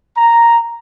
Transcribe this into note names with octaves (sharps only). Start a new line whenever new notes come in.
A#5